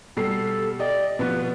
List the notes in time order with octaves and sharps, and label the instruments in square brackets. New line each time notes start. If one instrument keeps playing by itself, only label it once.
[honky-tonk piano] B2 G3 C7 [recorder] A4
[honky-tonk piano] G4 D#5 [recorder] D5
[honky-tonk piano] B2 F3 B3 [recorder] B4